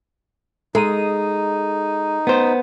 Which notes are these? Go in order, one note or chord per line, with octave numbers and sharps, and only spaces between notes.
G#3 D#4 A4 A#5 D#7
B3 C5